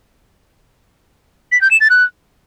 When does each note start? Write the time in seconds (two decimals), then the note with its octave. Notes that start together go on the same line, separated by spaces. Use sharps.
1.52 B6
1.61 G6
1.71 E7
1.80 A6
1.90 F#6